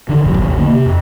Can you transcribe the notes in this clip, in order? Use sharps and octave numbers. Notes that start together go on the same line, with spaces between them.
D3 D#3
D#1 A1 F#2
A1 D#2 C3
D3 A3 A#3
C3
F2